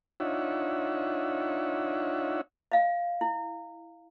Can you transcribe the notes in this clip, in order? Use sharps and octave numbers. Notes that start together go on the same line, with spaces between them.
D4 D#4 F4 C#5 E5 F#5
D#5 F5
E4